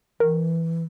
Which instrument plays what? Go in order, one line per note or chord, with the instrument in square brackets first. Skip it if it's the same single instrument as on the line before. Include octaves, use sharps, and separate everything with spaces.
[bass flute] E3 [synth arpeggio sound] A#4